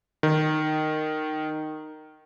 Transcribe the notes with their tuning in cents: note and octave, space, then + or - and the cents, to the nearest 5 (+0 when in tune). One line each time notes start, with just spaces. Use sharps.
D#3 -10